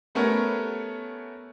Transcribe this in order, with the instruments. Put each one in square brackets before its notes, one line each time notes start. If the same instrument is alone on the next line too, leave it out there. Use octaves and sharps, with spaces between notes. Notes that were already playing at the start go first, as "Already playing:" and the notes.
[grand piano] G3 A3 B3 C#4 A#4 C#5